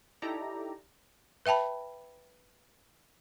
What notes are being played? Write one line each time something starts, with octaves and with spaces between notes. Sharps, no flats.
D#4 E4 G4 A4 D5 A#5
B4 E5 G5 A5 B5